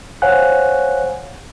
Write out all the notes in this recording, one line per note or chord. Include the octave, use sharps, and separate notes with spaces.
C5 C#5 F5 F#5 G#5 F#6